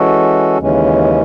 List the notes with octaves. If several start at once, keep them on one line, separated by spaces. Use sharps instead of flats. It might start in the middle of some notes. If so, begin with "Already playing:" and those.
Already playing: E3 G#3 C#4 F#4 A4
D#2 C#3 E3 G#3 C#4